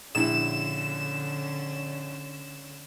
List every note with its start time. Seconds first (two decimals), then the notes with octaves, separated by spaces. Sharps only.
0.15 A#1 D3 C#4 E4 E7